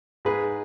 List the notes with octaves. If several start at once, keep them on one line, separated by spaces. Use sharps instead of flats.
G#2 G#4 B4